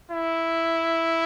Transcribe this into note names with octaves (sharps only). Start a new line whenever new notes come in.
E4